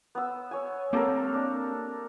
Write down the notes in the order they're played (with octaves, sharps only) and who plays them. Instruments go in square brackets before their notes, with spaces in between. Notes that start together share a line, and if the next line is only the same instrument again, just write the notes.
[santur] B3 E6
C#5 G#5
[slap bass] A#3 C4 [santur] G4 A4 A#4
[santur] D4